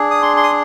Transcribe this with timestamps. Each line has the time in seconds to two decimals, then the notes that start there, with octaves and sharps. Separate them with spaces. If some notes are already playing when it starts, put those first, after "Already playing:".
Already playing: D4 G#4
0.11 D#6
0.22 C6
0.37 C6
0.43 D#6